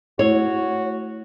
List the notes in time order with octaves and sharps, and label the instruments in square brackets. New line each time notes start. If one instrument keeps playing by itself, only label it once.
[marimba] A3 E4 [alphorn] F#4 [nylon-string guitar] C#5